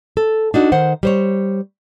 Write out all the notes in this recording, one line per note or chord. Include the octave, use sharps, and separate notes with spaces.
A4
D4 D#4 F#4
D#3 C5 F#5
G3 C5 C#5